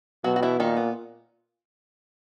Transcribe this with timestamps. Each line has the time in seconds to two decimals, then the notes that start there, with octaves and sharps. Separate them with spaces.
0.24 B2 F#3 F#4
0.36 F#4
0.43 E3 E4
0.59 A#2 D#3 D#4
0.77 B3